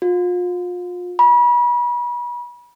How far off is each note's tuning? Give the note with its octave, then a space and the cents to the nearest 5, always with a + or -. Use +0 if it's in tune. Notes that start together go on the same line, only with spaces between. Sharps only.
F4 +35
B5 -35